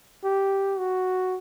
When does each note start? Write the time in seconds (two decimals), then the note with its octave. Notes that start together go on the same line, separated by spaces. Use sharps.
0.24 G4
0.78 F#4